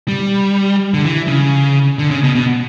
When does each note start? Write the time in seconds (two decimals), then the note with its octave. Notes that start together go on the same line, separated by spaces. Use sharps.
0.08 G3
0.94 D3
1.04 E3
1.28 C#3
1.99 D3
2.11 C#3
2.24 B2
2.35 B2